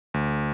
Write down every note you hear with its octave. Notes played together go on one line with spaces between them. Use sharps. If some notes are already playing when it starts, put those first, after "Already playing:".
D2